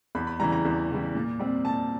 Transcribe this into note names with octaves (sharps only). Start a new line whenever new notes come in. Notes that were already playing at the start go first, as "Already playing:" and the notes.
E2 B5
B5
C#3 E3 G3 A#5
A#5
E2
C#3 E3 G3
A#2
G3 C4
A#2 A5